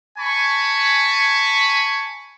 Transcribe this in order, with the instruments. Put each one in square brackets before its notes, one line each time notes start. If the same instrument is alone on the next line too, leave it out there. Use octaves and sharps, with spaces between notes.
[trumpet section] G#5 A5 B5 C#6